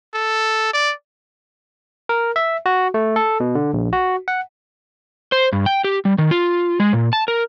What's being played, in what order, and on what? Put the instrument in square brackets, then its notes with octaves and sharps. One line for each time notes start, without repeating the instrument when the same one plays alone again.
[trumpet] A4
D5
[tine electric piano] A#4
E5
F#4
A3
A4
B2
D3
A#1
F#4
F#5
[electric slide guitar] C5
G2
G5
G4
G3
D#3
F4
G#3
A#2
A5
A#4